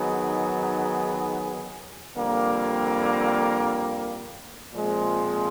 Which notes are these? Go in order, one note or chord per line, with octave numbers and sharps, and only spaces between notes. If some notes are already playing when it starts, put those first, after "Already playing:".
Already playing: D#3 F#3 B3 D#4 G#4
F2 D3 G3 A#3
A#2 F3 G#3 C4